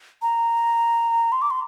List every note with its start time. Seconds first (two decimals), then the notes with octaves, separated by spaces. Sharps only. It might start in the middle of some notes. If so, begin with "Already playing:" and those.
0.22 A#5
1.32 C6
1.42 D6
1.50 C6